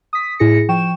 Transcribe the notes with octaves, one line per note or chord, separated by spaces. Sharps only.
D#6 B6
A2 E4 G#4 A#6 C#7
F3 G5 C#6 E7